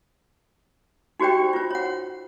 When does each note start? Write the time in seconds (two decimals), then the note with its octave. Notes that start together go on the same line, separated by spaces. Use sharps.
1.20 D#4 F#4 G4 C5 D5 G5
1.53 F4 C5
1.71 C#5 F#5